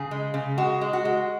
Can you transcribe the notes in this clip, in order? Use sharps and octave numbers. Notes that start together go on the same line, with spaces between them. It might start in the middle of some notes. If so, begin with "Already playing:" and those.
Already playing: C#3 G#4
G#3
C#3
G#3 F#4
G#3
F#4
G#3